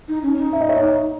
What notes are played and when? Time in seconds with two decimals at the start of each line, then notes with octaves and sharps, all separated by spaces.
0.08 D#4
0.23 C#4
0.38 D#4
0.53 E5
0.61 D#5
0.69 C#5 E5